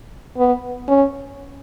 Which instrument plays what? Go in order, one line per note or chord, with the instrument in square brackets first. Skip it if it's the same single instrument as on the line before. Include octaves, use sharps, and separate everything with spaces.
[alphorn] B3
C#4